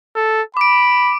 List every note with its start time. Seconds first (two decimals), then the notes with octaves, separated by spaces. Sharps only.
0.16 A4
0.57 B5 D6 D7